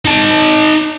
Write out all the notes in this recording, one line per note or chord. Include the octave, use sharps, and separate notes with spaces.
D#4 A5